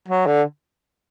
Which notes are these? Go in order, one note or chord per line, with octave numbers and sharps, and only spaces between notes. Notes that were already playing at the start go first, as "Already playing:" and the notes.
F#3
D3